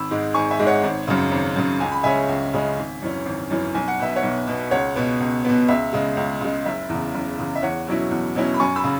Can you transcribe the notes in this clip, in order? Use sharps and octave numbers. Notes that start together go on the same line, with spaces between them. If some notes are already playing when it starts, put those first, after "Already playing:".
Already playing: G#1 B5 E6
G#2 G#3
G#1 G#5 C#6
E5 G#5
G#2 G#3
C#5 F#5
G#1
F#2 C#3
G#1
F#2 C#3
C#2 G#5
B5
C#3 G#3 C#4 E5 G#5
C#2
C#3 G#3 C#4
G#1
F#2 E3 C#4
G#1
F#2 E3 C#4
B1 G#5
F#5
B2 B3 E5
C#5 F#5
B1
B2 B3
C#2 C#5 F#5
B2 B3
C#2
B2 B3
C#2 E5
C#3 G#3
C#2
C#3 G#3
F#1 E5
E2 C#3
F#1
E2 C#3
E5
E2 C#5 F#5
B2 F#3 C#4 E4
E2
B2 F#3 C#4 E4
B5
F#2 G#5 C#6
B5 E6
C#3